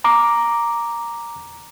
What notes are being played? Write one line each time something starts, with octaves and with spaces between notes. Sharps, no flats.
A#5 D6